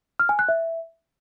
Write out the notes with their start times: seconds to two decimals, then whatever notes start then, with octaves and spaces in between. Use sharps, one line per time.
0.19 F6
0.29 G#5
0.39 F#6
0.49 E5